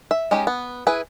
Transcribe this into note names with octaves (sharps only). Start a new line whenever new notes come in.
E5
G#3 C#4 D#4 G4
B3
E4 G#4 B4